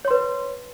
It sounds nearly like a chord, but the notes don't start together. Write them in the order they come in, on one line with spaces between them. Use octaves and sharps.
C#5 C6 B4